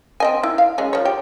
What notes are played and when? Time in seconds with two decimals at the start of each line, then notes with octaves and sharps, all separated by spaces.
0.20 C4 D#5 G#5
0.43 E4
0.58 F5
0.78 F#3 G#3 C#4
0.93 F3 C#5
1.05 G4